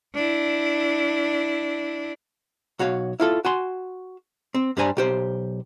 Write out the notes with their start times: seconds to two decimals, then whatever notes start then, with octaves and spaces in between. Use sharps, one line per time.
0.14 D4 E4
2.79 B1 F#4 C#5 F5
3.20 E4 F4 A4
3.45 F#4 G#5 C6
4.54 C4
4.77 G2 G3 D4 C5 G#5 A#5
4.97 B1 G4 C5